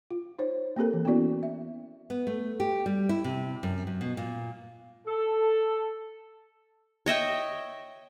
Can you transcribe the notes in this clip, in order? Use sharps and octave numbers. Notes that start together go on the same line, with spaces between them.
F4
D#4 C5 C#5
A#3 C4 G4 A4 A#4
E3
B3 C#4 E4 F#4 D5
E5
B3
A3
G4
G3
E4
C3
F#2
F#2
B2
A#2
A4
C#5 D#5 E5 G5